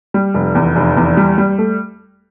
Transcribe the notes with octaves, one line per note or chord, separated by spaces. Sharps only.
G3
F1
E2
F1
E2
G3
G3
A3